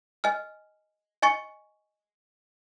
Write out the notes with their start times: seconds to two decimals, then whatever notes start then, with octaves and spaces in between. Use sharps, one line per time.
0.24 D#5 G#5 F6
1.22 D#5 G#5 C#6 A6 C#7